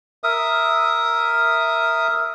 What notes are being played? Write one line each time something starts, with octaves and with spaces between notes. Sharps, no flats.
A#4 E5 D#6